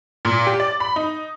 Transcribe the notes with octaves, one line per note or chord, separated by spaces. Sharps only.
A#2
G4
D5
B5
D#4